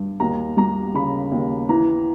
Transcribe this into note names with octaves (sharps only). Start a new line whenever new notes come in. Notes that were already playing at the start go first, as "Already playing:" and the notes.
Already playing: G2
D#2 A#5
G3 A#5
C#3 B5
D#2
E3 A#5